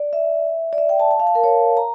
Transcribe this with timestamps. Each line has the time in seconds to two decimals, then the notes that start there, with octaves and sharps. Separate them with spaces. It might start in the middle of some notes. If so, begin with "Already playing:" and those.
Already playing: D5
0.13 E5
0.73 D5
0.78 E5
0.89 G5
1.00 A5
1.11 A5
1.20 F5
1.27 A5
1.35 A#4
1.44 C#5
1.77 A#5